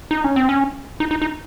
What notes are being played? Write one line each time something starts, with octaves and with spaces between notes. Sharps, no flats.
D#4
C#4
C4
C#4
D#4
D#4
D#4